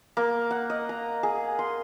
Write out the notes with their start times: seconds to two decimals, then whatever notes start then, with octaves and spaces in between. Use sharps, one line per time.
0.17 A#3
0.51 F#5
0.70 D#5
0.89 A#5
1.23 G#4
1.59 C6